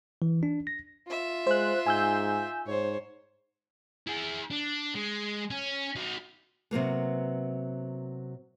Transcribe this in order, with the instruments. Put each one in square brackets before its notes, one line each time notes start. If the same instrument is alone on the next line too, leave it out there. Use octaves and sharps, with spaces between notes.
[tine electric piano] E3
D4
A#6
[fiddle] F4 E5
[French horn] G#3 [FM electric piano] C5 F#6
[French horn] G#2 [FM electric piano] G#5 E6 G6
[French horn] G#2 [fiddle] C5 C#5
[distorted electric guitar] E4 G#4
D4
G#3
C#4
D#4 F#4
[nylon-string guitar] C3 F#3 A#3 B3